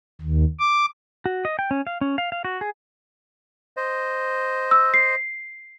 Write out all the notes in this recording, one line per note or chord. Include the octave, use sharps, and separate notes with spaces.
D#2
D6
F#4
D#5
G5
C#4
F5
C#4
F5
F5
F#4
G#4
C5 D#5
E6
C7